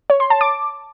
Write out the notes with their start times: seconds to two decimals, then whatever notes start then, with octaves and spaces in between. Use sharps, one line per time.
0.10 C#5
0.20 C6
0.30 A5
0.41 D6